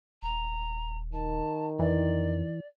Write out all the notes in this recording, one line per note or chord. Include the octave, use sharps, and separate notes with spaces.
D#1 A#5
D#3 A5
F2 E3 D5